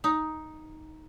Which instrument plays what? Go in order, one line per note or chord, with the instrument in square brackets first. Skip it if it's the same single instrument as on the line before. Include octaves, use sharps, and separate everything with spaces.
[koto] D#4